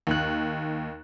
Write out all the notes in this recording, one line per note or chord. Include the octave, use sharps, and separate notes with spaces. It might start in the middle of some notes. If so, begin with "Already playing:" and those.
D#2 F#6